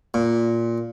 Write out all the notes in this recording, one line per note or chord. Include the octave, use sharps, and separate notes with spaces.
A#2